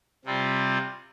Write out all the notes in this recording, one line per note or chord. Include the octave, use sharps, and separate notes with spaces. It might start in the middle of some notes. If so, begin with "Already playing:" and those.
C3 G3 C4 F4